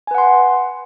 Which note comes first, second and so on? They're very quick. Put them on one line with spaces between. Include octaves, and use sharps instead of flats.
G#5 B4 F#5 C6